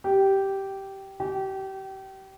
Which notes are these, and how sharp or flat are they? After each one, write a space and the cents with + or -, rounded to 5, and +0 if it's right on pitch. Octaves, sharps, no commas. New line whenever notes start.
G4 -10
G4 -30